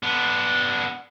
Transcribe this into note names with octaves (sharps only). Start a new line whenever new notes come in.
B3 D4